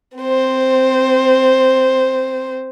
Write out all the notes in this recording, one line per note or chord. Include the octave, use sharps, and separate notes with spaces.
C4 C5